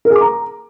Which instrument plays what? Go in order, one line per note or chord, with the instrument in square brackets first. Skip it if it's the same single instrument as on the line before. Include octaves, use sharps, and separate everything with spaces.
[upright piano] A#4
G#4
D6
A#5